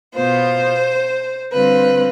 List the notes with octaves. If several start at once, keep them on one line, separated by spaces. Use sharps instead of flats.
B2 B3 F4 C5
D3 G3 C4 F4 B4